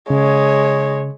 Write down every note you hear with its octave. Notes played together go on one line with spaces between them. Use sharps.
C#3 G#3 C#5